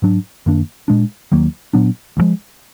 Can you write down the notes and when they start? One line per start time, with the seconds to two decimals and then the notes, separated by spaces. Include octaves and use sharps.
0.02 G#2 F#3 D4
0.46 F#2 D#3 A#3 D4
0.88 A#2 G#3 D4
1.32 D#2 D#3 F#3 A#3
1.73 A#2 F#3 B3 D4
2.17 D2 D3 F3 G#3